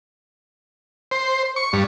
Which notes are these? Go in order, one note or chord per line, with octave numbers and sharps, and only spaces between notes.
C5
C#6
G2